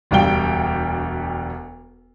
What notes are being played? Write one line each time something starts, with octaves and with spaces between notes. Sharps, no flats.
E1 D2 G3 F5 G5 G7